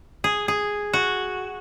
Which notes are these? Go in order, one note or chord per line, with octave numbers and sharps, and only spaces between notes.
G#4
G#4
F#4